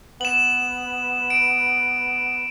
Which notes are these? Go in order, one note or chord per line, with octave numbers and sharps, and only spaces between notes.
B3 E7 F#7
D7